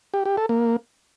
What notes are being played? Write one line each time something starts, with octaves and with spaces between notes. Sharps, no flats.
G4
G4
A4
A#3